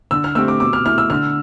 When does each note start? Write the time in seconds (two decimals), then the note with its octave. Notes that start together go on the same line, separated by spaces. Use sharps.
0.11 D3 E6
0.24 F6
0.35 A3 C4 G4 E6
0.48 D6
0.60 B2 D6
0.73 F6
0.85 A3 E4 F6
0.98 E6
1.10 D3 F6